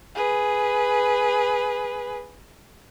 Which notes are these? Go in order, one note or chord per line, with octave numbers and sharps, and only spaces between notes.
G#4 B4